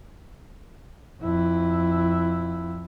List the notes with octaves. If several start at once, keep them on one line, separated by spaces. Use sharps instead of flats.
F2 E4